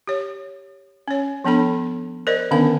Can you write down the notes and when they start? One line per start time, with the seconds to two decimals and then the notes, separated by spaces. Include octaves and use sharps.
0.07 G4 C#5
1.08 C#4 C#5
1.45 F3 B3 D4 A4 B5
2.27 A#4 C5 D5 D#5
2.51 D3 D#3 B3 C#4 D4 F5